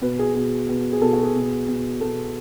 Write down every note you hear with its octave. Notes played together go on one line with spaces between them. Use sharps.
B2 B4
G#4
B2 G#4
B2
G#4
B2 A4
F#4
G#4
B2
B2
B2 A4